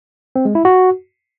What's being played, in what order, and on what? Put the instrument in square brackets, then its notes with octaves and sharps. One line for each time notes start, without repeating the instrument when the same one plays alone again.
[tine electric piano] C4
G#3
E4
F#4